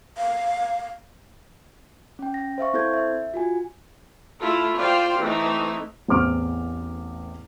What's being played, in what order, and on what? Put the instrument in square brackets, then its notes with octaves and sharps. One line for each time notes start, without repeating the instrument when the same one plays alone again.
[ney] F5
[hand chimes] C#4 G5
A#6
C5 E5 F5 C#6
C4 E4 A4 C5 G6 G#6
E5
F4 F#4 G#5
[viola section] A3 E4 F4 A4
F4 C5 D5 F5 G5
E3 A3 C4 D#4
[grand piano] A1 E2 C4 D6 F6 D7